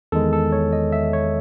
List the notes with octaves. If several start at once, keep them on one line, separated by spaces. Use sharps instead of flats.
E2 D#3 G#3 A4
A4
C#5
D#5
E5
C#5